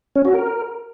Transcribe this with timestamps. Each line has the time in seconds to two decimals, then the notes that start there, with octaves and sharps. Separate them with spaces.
0.16 C#4
0.25 F#4
0.34 A#4